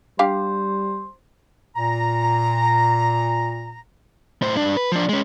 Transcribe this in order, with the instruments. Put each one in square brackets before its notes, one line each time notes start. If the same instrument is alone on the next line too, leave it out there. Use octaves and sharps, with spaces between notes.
[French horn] G3 [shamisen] D4 G4 F5 [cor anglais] C5
[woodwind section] A#2 A#5
[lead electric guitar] A2 C5
G2 D4
B4
F3 D4
G#3 C#4